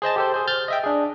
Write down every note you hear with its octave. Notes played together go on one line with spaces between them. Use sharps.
G#4 C5 D#5 A5
G4 A4 C5
G#4 C5
F6 G6 A6
D#5 E5 G5
D4 G#4